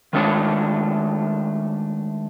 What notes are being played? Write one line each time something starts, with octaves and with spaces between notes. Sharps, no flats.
D#3 G#3 A3 D4 C#5